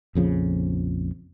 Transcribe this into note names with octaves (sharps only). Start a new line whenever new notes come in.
A#1 F2 C#3 F3